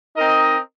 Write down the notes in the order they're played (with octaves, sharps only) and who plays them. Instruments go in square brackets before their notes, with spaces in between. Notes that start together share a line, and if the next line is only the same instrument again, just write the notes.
[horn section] C4 D#4 A#4 D#5